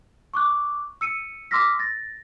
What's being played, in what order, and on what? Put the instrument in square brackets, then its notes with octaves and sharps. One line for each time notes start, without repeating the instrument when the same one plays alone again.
[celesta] C#6 D6 F#6
E6 C#7 D#7
C6 D6 E6 F6 A#6 B6
A6 A#6